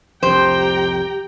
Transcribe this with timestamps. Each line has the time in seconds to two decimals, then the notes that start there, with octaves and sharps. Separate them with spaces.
0.23 C2 F2 G4 C5 G5 A#5